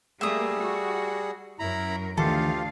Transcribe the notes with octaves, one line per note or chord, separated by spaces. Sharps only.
G3 A3 A#3 G#4 E5 D#6
F#4
F#2 E4 A#4 A#5 B5
D2 D#3 E3 F4 G4 A4 F5